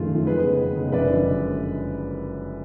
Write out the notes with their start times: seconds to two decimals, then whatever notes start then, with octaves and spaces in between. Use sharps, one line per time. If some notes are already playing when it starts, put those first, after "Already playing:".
Already playing: G#1 F#2 F3 A3 F4 G#4
0.11 F#2 F3 A3
0.27 F2 G#4 B4
0.43 C#3 G#3 B3
0.60 F2
0.76 C#3 G#3 B3
0.92 F#1 B4 D5
1.09 F#2 D3 F3 G#3